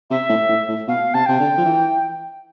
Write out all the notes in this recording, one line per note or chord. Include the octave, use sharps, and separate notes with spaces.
C3 E5
A2
A2
A2
B2 F5
C3 A5
C3 G5
D3
F3
E3